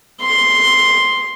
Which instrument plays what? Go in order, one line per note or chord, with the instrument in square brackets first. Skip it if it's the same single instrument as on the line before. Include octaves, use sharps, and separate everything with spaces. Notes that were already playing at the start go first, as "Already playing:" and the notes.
[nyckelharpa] C6